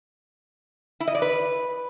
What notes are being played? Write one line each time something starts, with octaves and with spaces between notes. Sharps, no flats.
E4
D#5
D5
B4